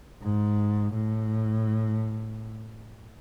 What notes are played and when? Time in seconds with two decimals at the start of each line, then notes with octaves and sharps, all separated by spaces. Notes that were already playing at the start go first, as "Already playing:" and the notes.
0.22 G#2
0.94 A2